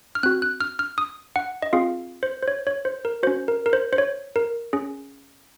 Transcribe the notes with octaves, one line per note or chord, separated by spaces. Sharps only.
F6
C4 F#4 F#6
F#6
F6
F6
D#6
F#5
D#5
C4 F4 G#4 F5
C5
C5
C#5
C#5
C5
A#4
C#4 F#4 C5
A#4
A#4
C5
C5
C#5
A#4
C#4 G#4